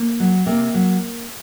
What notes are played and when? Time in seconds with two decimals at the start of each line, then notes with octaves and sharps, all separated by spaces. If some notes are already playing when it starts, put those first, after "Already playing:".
Already playing: A#3
0.20 F#3
0.46 C3 A#3
0.74 F#3